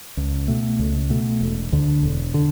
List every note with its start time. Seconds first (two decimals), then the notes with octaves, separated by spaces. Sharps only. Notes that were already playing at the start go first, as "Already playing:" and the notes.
0.17 C#2
0.48 B2 A3
0.79 C#2
1.10 B2 A3
1.41 E1
1.72 D2 D3
2.03 E1
2.34 D3